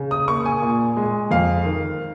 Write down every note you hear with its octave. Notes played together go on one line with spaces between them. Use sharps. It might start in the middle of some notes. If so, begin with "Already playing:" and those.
Already playing: C#3
D#6
A#3 C#6
G#5
A#2
G#3
F2 F5
D#3